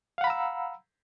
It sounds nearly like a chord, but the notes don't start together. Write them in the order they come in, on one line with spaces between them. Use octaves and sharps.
F5 F#5 B5 A#5 E6